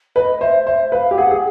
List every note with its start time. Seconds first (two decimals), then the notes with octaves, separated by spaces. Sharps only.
0.16 B4 D#5
0.41 C5 E5
0.66 C5 E5
0.92 B4 F5
1.11 G4
1.18 G#4 F#5
1.31 G#4